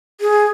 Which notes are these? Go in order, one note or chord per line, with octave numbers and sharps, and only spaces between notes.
G#4